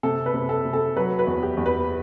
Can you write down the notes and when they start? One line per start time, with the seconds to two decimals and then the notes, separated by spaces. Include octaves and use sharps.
0.03 C3 A4
0.26 B4
0.34 C3
0.49 A4
0.65 C3
0.73 A4
0.96 F#3 B4
1.19 B4
1.27 E2
1.43 G4
1.57 E2
1.66 B4